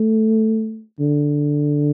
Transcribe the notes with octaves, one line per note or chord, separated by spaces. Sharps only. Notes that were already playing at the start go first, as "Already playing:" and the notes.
Already playing: A3
D3